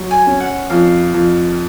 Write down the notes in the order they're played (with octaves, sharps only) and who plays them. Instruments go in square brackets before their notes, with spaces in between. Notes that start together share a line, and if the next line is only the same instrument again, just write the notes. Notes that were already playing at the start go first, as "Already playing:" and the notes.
Already playing: [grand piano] F#3
[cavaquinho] G#5
[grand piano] C#4
[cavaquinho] F#5
[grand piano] F2 [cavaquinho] F5
[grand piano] F2